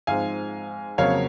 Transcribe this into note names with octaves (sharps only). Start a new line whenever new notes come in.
G#2 F3 G#3 C4 F5 G#5
F2 C#3 F#3 A#3 C#5 F5